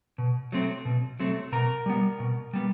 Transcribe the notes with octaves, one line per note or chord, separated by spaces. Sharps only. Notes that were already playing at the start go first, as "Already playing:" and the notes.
B2
F#3 A3 C4
B2
F#3 A3 C4
B2 A#4 A#5
G3 B3
B2
G3 B3